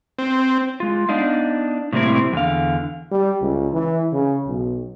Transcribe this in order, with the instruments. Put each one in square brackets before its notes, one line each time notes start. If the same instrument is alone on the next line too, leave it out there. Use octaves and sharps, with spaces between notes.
[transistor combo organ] C4
[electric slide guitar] G#3 F4
B3 D4 D#4 F5
A2 C3 G3 A#3 C4 E4
E2 D3 F5
[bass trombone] G3
C#2
E3
C#3
B1